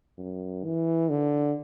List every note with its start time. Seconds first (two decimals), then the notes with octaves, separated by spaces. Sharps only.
0.18 F#2
0.64 E3
1.10 D3